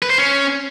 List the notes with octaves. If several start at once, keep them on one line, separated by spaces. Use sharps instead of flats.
B4
C5
C#4